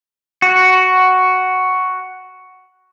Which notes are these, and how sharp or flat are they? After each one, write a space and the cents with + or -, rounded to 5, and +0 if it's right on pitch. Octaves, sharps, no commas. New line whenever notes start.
F#4 +5